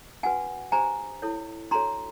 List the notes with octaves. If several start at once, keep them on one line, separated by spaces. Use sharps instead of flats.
C#4 F#4 B4 F#5 G#5
D4 G4 C5 G#5 A#5
E4 A4 C#5
D4 F#4 A4 C#5 A#5 C6